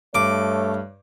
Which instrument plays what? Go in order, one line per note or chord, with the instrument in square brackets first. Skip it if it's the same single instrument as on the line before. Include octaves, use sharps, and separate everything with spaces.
[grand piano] G2 [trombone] A3 [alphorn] C#5 [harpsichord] D6